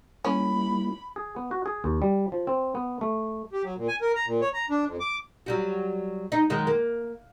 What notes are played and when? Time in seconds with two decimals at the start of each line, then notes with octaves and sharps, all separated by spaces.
0.25 G3 A#3 C#4 E4 B5
1.16 G#4
1.36 B3
1.51 F#4
1.66 G#4
1.84 D#2
2.02 G3
2.32 F3
2.47 C4
2.75 B3
3.01 A3
3.52 G4
3.64 F#3
3.76 A#2
3.88 G#5
4.01 A#4
4.15 A#5
4.27 A#2
4.41 C#5
4.54 A#5
4.70 D4
4.86 F2
5.00 D6
5.46 F#3 G3 F#4
6.32 D#4
6.50 F#2 D#3 G#3
6.67 A#3